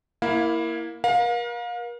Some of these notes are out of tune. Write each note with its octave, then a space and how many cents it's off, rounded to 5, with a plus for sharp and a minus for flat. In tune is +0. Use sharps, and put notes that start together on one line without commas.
A#3 +0 E4 +0 F5 +25
A#4 +40 F5 +30